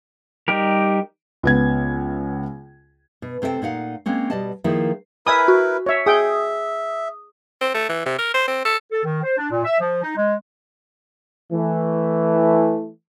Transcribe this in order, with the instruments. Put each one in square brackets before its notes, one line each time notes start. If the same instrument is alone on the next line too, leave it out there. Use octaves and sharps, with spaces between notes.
[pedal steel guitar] G3 D#4 G4 A#4
[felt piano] C#2 B3 G#6
[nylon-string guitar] B2
C3 C4 A4 D#5 G5
A#2 D#4 F5 F#5
G#3 A#3 C4 C#4
B2 G3 D5 D#5 A5
D#3 F3 A#3 E4 G#4
[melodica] E4 A#4 B4 [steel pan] E5 G#5 D#6 [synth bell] B5
[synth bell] F#4
[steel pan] C#5 E5
[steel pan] G#4 G5 [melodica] E5 [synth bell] D#6
[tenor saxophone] C4
A3
E3
C3
A#4
C5
C4
A4
[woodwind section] A4
D#3
C5
D4
A#2
E5
F3
D#4
G#3
[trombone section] E3 A3